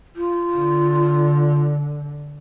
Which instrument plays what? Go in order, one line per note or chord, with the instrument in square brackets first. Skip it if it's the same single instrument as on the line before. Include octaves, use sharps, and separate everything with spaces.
[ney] F4
[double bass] D3